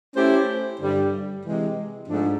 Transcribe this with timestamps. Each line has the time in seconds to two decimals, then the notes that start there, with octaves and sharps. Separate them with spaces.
0.15 A3 C#4 E4 G4 C5
0.79 G2 D3 G3
1.44 C3 E3 G#3
2.07 G#2 F3 A3 D4